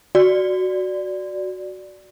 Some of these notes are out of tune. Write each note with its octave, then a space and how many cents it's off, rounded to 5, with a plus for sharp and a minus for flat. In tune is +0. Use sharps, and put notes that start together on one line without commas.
F#4 +0 D5 +0